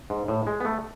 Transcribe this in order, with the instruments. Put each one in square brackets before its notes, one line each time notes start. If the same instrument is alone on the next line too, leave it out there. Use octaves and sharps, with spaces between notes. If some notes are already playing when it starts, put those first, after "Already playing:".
[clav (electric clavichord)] G#2
A2
G#3
B3
A3